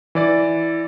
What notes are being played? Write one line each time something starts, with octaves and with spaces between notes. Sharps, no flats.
E3 D5 A6